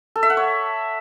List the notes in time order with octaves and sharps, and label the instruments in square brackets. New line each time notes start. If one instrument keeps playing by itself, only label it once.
[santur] A4
E5
F#5
C#5